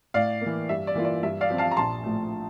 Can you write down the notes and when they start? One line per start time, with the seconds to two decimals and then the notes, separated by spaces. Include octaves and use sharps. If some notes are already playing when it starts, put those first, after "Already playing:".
0.14 A2 D5 F5
0.41 E3 A#3
0.69 G2 E5
0.87 D5
0.95 E3 A#3 F4
1.05 D5
1.23 G2 E5
1.41 D5 F5
1.50 F3 C4
1.58 F5 A5
1.71 A#5
1.77 A#1 A5 C6
2.03 A2 F3 A3